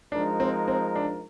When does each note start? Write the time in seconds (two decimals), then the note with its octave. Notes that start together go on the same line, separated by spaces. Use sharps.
0.12 F3 G#3 D4 D#4 A#4
0.40 C4
0.68 C4
0.96 D4